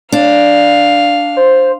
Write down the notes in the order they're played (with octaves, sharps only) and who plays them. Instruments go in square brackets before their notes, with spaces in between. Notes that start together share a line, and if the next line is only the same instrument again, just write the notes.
[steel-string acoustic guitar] D4 [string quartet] F5
[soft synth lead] C5